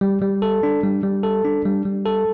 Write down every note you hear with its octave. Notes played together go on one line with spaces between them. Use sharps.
G3
G3
A4
D4
G3
G3
A4
D4
G3
G3
A4